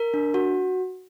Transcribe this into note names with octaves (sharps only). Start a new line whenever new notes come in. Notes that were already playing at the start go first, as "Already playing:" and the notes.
Already playing: A#4
D4
F#4